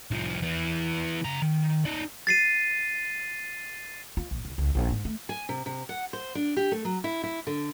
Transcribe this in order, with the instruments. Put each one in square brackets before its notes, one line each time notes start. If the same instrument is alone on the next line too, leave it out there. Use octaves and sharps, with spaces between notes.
[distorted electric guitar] C2 F3
E3 B3
C#3 A#5
D#3
D#4 D5
[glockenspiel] A6 C7 D#7
[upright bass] F4
A#1
C2
C#2
A#1
G#2
A3
[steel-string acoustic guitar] G#5
C3
C3
F#5
C5
D4
G4
A3
F#3
E4
E4
D3